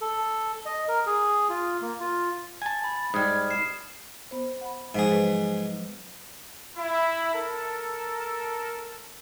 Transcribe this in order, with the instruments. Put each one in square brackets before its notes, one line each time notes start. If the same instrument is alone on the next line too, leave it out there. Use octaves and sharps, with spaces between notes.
[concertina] A4
D#5
A#4
G#4
F4
A#3
F4
[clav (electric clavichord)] G#5 A5
[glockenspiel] B5
[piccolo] A6
[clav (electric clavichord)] G#2 G3 [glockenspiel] D#6 F6 [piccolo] G#6
[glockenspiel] C7 [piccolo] E7
[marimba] B3 C5
F#5 B5
[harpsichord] G#2 G#4 [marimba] F3 G#3 C5
[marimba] F#3 B4
[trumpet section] E4
A4 A#4